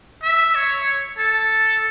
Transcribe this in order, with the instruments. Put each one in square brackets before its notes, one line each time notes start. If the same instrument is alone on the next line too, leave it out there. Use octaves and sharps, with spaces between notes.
[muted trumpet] E5
C#5
A4